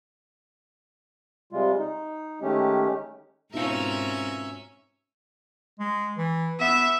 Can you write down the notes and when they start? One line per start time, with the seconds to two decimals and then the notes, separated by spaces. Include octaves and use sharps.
1.53 C3 G3 G#3 F4
1.79 D#4
2.42 D#3 G#3 A3 C#4 G4
3.53 G#2 B2 C4 C#4 D#4 F4 A#4 E5
5.80 G#3
6.18 E3
6.60 B3 E5